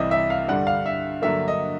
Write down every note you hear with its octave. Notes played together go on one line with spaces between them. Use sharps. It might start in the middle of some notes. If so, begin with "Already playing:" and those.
Already playing: C2 C3 E3 G3 D#5 E5
E5
F5
G2 D3 G3 F#5
F5
E5
G2 D3 F#3 A#3 E5
D#5